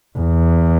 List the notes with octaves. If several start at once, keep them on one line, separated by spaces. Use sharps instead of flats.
E2